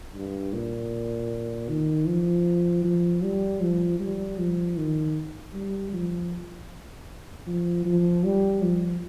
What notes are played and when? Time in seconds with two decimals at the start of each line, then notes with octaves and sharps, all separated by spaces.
0.15 G2
0.53 A#2
1.69 D#3
2.07 F3
2.84 F3
3.23 G3
3.61 F3
4.00 G3
4.39 F3
4.77 D#3
5.54 G3
5.93 F3
7.47 F3
7.86 F3
8.24 G3
8.62 F3